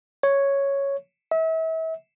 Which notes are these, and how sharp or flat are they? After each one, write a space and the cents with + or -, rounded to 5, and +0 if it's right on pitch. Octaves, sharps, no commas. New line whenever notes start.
C#5 +0
E5 -35